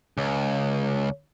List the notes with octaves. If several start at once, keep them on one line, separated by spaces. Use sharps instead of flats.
C#2